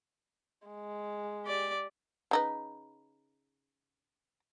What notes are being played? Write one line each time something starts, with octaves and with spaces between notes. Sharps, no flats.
G#3
G4 D5
C#3 D#4 B4